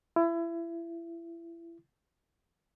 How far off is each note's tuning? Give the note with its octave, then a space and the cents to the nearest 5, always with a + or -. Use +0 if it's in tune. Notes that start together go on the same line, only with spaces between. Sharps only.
E4 +30